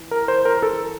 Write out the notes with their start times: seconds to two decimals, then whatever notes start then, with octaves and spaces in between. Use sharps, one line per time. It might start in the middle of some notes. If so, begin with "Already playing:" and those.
Already playing: E3
0.11 A#4
0.28 C5
0.45 A#4
0.63 A4